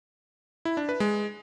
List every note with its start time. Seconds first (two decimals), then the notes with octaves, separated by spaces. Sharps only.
0.65 E4
0.77 D4
0.89 B4
1.00 G#3